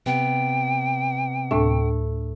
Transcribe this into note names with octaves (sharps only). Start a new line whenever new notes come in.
C3 B3 G5
D2 A2 A3 D4